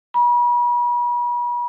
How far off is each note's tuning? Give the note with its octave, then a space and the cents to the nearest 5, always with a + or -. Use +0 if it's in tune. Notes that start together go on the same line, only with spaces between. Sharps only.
B5 -40